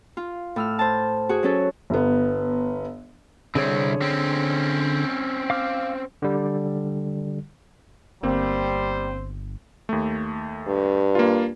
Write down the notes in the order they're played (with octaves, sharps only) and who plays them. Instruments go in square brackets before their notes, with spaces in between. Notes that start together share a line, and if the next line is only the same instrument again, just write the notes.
[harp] F4
A2 E6 F6
C5 A5
F#4 G#4
F#3 C#4 A4
[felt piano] G1 B3
[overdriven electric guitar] C2 C4 [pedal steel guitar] D3 G#4 C#5
[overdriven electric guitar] C4 C#4
[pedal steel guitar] F5 D6 F6
[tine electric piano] D3 G3
[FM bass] G1 [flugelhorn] G3 [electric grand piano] A#3 C4 [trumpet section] C5
[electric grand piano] D#2 A3
[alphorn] G2
[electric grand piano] A#3 F4